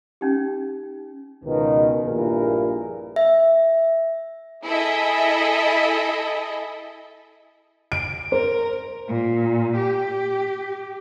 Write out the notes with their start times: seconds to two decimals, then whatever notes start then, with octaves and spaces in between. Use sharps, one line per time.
0.21 C#4 D#4 G4
1.44 C#2 B2 D#3
2.04 A#1 G2 A#2 E4 G#4 A#4
3.16 E5
4.65 E4 G#4 A4 D#5 E5
7.92 D7
8.32 A#4 C5
9.08 A#2
9.76 G4